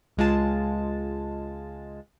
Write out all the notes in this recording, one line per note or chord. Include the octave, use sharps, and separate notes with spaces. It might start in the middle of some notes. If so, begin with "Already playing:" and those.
C#2 G#3 F4 A5